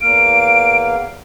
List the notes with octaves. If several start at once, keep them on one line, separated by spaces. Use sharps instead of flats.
E2 A#3 F5 D7